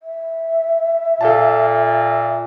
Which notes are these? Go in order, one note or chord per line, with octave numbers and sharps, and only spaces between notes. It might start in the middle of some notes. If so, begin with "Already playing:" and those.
E5
A#2 A4 F5 A5